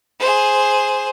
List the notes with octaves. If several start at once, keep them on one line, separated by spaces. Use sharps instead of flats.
G#4 C5